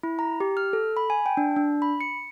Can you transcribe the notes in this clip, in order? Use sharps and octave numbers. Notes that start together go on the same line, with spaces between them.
E4
A#5
G4
F6
A4
B5
G#5
G5
D4
D4
B5
C#7